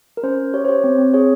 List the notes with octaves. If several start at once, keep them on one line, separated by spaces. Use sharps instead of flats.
A#4
C#4 C5
C#4
G4 C#5
C5
G4 C#5
C4 C5
C4
G#4 C#5